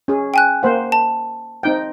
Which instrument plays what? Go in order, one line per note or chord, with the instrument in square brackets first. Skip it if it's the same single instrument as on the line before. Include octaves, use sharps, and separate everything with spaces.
[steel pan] C#4 G#4
[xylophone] G5 G#5 F#6
[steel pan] A#3 C5 F#5
[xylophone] A5
[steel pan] C4 D#4 G5